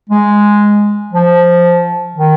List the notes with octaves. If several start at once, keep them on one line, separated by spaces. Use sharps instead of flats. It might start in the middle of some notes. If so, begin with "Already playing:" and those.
G#3
F3
D#3